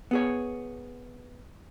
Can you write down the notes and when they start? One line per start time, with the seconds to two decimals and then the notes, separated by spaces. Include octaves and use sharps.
0.11 B3 G#4 C#5